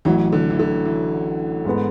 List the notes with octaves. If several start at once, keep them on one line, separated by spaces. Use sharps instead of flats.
A1 A2 E3 F#3
D3
E3
D3
E3
G#2 G#3 B3